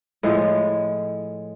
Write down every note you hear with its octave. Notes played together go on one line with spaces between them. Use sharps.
A2 F3 G#3 C#5